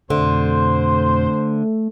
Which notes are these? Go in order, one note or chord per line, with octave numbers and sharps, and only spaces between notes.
F2 B2 D3 A3 C5 C6